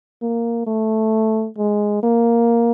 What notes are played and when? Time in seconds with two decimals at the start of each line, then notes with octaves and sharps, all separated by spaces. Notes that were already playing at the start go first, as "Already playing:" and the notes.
0.22 A#3
0.67 A3
1.58 G#3
2.03 A#3